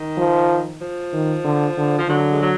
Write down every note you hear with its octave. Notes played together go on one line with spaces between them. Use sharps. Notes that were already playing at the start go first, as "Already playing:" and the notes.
Already playing: D#3
F3
F3
D#3
D3
D3
F3
D3 F#3
G#3
F#3